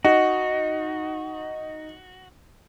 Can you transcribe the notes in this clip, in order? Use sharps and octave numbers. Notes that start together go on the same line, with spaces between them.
D#4 F#4